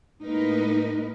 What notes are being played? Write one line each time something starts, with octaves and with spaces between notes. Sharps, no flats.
A2 G#3 A#3 D#4 A#4 B4